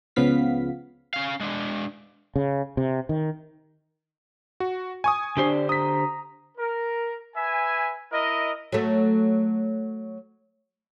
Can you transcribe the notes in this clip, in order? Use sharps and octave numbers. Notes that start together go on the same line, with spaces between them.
C#2 C#3 F3 B3 F5 B6
C#4 F5
G#3 D4
C#3
C3
D#3
F#4
G#5 C#6 D#6
D3 D4 G4 C5
A#5 D#6 B6
A#4
B4 E5 G#5
E4 A#4 D#5
F#3 A3